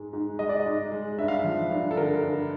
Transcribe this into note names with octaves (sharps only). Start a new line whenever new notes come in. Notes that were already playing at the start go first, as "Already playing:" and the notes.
Already playing: G#2 G#3
G#2
G#3 D#5
D5
D#5
G#2
G#3
G2 E5
F5
E5
F3
G2
A4
D3 A#4
G2